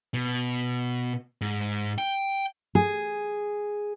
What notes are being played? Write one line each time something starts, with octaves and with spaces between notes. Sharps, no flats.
B2
G#2
G5
G#4